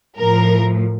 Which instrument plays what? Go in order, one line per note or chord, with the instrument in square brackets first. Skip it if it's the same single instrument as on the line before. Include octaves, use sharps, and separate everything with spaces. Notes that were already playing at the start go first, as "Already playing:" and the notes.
[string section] A2 F3 A#4